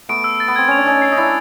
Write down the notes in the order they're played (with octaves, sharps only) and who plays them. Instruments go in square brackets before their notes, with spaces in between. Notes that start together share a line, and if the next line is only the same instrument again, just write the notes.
[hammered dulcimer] A3 B3 [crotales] D7
[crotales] E6
A6
[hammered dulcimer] B3
[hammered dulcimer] C4 [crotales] G#6
[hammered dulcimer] C#4 [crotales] F7
[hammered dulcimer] D4
[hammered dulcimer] C#4 D#4 [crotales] G#6
[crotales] C7
[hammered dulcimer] D#4
[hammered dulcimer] D4 E4 [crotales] A6